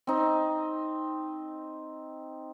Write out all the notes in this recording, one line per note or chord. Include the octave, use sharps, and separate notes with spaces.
C4 D#4